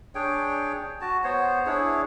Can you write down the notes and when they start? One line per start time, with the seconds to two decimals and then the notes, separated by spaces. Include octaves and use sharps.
0.15 D4 G#4 C#5 G5
1.01 F#4 A5
1.24 B3 C5 C#5
1.66 D4 E4 G#4 C#5